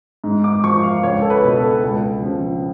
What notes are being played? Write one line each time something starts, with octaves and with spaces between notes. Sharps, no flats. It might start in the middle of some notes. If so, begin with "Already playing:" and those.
G#2
D6
F3 C#6
F5
C#2 C#5
A4
B4
B2
A4
C#2
C#3 F3